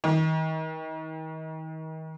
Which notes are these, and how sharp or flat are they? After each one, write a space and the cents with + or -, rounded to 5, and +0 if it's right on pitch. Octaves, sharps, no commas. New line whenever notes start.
D#3 +35